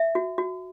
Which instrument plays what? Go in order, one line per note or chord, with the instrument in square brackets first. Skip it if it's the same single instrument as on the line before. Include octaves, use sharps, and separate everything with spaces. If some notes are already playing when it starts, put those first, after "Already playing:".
Already playing: [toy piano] E5
F#4
F#4